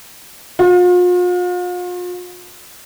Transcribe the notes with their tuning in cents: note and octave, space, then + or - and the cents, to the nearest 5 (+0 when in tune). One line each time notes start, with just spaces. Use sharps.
F4 +40